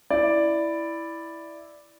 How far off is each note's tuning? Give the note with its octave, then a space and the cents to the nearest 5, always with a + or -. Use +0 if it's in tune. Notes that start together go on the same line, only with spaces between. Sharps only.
E4 +0 D5 +0